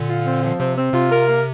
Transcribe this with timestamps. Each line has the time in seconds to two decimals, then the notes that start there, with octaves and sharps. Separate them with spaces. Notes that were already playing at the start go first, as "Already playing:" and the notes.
Already playing: A#2 D3
0.09 F4
0.26 C4
0.43 F3
0.59 C3 C4
0.76 C4
0.93 C3 F4
1.11 A#4
1.28 A#3